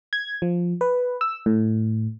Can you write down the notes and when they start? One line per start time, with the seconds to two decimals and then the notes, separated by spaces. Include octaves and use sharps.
0.13 G#6
0.42 F3
0.81 B4
1.21 E6
1.46 A2